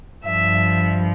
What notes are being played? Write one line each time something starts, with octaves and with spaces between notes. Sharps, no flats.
G2 F3 E5